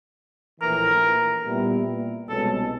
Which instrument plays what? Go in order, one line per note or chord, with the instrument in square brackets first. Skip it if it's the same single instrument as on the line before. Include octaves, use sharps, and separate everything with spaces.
[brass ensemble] A#1 A2 E3 [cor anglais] A#4
[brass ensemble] A#2 G3 B3 E4
[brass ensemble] C2 B2 G#3 C#4 [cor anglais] A4